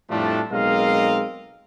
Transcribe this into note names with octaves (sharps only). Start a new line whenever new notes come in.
F2 A2 F3 G3 A3 D4
B1 G#3 C4 A#4 D#5 F5